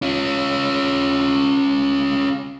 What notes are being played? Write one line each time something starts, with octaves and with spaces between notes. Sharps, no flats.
C#4 F4